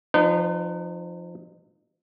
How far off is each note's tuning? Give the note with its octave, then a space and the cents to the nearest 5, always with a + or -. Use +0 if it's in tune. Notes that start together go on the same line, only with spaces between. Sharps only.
F3 +0 D#4 -35 B4 +35